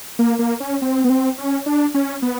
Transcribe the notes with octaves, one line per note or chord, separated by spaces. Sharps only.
A#3
A#3
C#4
C4
B3
C4
C#4
D4
C#4
B3